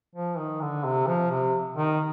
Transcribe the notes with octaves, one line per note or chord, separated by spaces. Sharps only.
F3
D#3
D3
C3
F3
C3
D#3